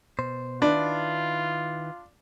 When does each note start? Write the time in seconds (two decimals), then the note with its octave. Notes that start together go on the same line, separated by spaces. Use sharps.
0.19 B2 C5
0.62 D#3 D4 E4 F4 B4